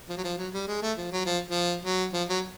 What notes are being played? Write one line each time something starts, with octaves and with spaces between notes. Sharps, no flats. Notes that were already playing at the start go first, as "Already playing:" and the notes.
F3
F#3
F3
F#3
G3
G#3
A3
F3
F#3
F3
F3
F#3
F3
F#3